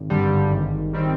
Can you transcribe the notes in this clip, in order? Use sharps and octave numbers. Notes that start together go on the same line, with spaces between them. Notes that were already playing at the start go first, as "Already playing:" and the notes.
Already playing: G#1
G2 D3 G3
G#1
D#3 G3 C4